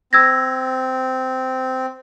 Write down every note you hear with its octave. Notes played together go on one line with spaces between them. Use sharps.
C4 E6 G#6 A#6